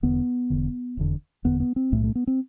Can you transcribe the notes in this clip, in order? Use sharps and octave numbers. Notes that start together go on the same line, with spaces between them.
E1 E2 D3 B3
E1 E2 D3
F1 E2 D3
F1 E2 D3 B3
B3
C4
B1 A2 A3
A3
B3
C4